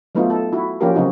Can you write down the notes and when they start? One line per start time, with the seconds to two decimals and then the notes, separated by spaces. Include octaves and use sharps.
0.15 F#3 A3 B3 D#4 F4
0.30 A4
0.53 E4 F#4
0.81 F3 A#3 C#4 F4 G4 A#4
0.95 C#3 F#3 C4 D#4 F#4